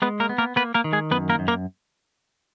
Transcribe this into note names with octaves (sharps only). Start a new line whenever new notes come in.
G#3 B3 B4
A#3 A#4
B3
A#3 A#4
A#3 B3 B4
A#3 A#4
D#3
G#3 G#4
F#2 B3 B4
A#3 A#4
F#2
A#3 A#4